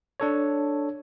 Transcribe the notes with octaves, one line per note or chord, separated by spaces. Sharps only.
D4 A4 C#5